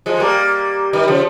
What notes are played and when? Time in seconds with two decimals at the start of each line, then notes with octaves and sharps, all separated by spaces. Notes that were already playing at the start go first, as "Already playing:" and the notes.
0.06 F3 G#3
0.20 G3 A#3
0.93 D#3 G3
1.08 C#3 F3